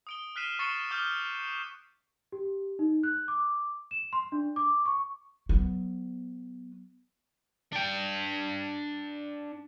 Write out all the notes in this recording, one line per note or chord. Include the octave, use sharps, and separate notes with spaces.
D#6 D7 G7
F6 F#6 B6 C7 D#7 E7
C#6 A6 C7 C#7 E7
D6 D#6 F6 G6
G4
D#4
F#6
D6
E7
C6
D4
D6
C#6
F#3 B3
D4 G5